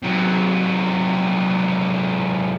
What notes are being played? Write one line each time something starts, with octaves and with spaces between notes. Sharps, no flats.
C3 F#3